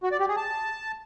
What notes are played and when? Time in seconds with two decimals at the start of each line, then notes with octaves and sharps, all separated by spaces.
0.03 F#4
0.11 D5
0.20 G4
0.28 G#4
0.37 A5